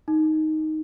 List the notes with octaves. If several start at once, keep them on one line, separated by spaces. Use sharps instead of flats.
D#4